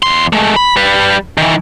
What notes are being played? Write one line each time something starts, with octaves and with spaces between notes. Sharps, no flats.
E2 C6
G#3 A3
B5
G3 B4
D#3 E3